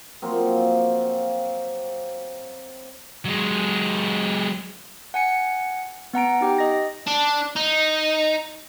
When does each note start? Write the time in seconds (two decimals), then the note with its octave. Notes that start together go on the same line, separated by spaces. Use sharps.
0.22 F3 F#3 A#3 C4
3.25 F#3 G#3
5.14 F#5 G#5 C#7
6.13 B3 F#5 A#5 D7
6.41 D#4 G4 G5
6.58 D#5 A#6
7.07 D4
7.56 D#4